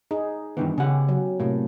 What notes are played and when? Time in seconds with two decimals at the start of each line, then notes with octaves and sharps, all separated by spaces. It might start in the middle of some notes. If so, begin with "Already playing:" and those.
0.11 D#4 G#4
0.57 G2 D#3 E3 B3
0.78 C#3 C#4 G4 F#5
1.09 F#3
1.40 A2 C3 A#3